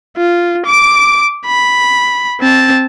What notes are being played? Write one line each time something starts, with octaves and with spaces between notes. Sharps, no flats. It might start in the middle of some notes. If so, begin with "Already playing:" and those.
F4
D6 D7
B5
C4 A5